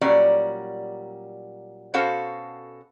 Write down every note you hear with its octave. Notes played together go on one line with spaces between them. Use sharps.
A#2 F#3 G3 C#4 D5
B2 C#4 F#4 A4 C5 F5